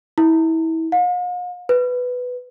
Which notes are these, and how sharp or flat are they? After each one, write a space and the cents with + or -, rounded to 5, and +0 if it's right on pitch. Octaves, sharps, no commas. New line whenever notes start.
E4 -30
F5 +45
B4 +5